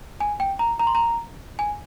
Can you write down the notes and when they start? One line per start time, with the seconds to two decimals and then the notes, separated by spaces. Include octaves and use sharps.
0.20 G#5
0.40 G5
0.59 A#5
0.80 A#5
0.87 C6
0.95 A#5
1.59 G#5